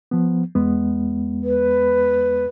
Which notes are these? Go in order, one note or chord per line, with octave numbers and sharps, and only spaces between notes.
F3 B3
E2 G#3 B3
B4